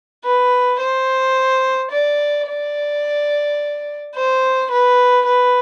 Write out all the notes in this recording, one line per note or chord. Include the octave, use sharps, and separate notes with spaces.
B4
C5
D5
D5
C5
B4
B4